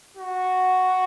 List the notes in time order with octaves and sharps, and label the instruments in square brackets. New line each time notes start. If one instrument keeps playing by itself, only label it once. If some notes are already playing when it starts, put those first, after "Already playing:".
[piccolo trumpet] F#4